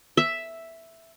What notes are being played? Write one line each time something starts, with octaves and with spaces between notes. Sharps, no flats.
E5